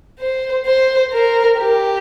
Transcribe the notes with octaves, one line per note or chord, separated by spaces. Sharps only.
C5
C5
A#4
G4